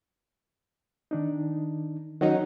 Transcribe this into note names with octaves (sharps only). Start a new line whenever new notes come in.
D#3 D4 D#4
D#3 F#3 C#4 D#4 F#5